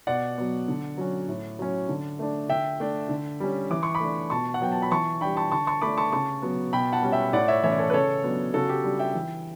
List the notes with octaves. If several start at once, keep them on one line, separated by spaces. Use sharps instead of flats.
B2 D5 F#5
F#3 B3
D3
F#3 C#4
A2
F#3 C#4
D3
A3 D4
D3 E5 G5
A3 D4
D3
G3 C#4
E3 D6
C#6
B5 D6
A3 D4
B2 A5 C#6
F#5
F#3 B3 G5
A5
B5
E3 A5 C#6
G3 D4 G5 B5
A5 C#6
D3 A5 C#6
A5 C#6
A3 D4 B5 D6
A5 C#6
C#3 A5 C#6
F#3 B3
B2 G5 B5
F#5 A5
G3 C#4
E5 G5
A2 D5 F#5
C#5 E5
E3 A3 C#4 C#5 E5
D5
A4 C#5
B4
C#3 A4 C#5
F#3 B3 D4
C#3 F#4 A4
G4
G3 D4
E5 G5
E3